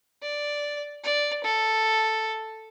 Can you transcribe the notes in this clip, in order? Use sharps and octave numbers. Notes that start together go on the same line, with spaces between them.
D5
D5
A4